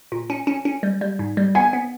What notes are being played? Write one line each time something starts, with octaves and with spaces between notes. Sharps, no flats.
A#2
C#4
C#4
C#4
G3
G3
G#2
G3
B3 G#5
B3